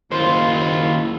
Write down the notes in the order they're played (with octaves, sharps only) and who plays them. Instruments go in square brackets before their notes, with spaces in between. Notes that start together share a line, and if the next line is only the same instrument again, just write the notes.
[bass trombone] F#1 [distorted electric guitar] D#2 F4 [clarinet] E4 [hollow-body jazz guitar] C5